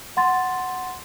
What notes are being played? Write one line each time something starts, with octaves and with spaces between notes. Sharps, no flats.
F#5 C6 A6